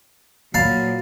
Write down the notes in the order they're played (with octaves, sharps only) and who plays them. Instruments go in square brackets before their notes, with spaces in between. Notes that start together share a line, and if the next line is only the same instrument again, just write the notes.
[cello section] A#2 F3 [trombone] F#3 [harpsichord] F5 A5 B5